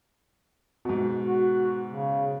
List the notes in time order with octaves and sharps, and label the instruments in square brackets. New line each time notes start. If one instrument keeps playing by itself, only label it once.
[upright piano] G#2 B2
[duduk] F#4
C#3